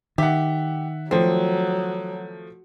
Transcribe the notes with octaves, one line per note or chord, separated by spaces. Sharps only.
D#3 G4 E5 F#5
F3 F#3 A3 C4